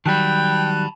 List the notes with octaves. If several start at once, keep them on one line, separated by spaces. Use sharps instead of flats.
D#3 F#3 G3 G5 A5 B5 F#6